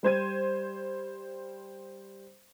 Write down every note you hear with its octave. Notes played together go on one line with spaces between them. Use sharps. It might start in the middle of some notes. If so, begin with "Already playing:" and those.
G3 C5 G#6 D#7